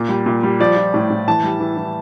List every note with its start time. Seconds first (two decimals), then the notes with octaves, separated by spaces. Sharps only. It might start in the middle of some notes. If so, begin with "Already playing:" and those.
Already playing: A#2
0.09 G3
0.26 A#2
0.43 G3
0.60 F3 D5
0.77 F3
0.94 A2
1.10 A2
1.28 E3 A5
1.44 G3
1.60 E3
1.77 E3